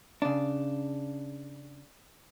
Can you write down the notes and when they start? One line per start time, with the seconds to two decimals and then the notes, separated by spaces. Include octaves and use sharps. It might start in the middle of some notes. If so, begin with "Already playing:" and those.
0.22 C#3 D4